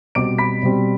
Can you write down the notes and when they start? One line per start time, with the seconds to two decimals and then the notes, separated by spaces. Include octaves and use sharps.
0.15 B2 G3 C4 D6 D7
0.38 B5 B6
0.63 B2 G3 C4